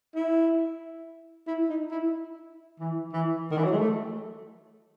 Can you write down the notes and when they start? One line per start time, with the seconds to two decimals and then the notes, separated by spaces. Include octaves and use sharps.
0.15 E4
1.47 E4
1.69 D#4
1.91 E4
2.79 E3
3.13 E3
3.51 D#3
3.57 E3
3.65 F#3
3.72 G#3
3.79 A3